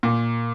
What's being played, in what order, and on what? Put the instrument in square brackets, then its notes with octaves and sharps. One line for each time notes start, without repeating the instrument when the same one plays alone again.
[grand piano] A#2